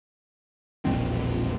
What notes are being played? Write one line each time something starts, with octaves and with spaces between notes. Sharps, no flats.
E1 A#1 F2 C4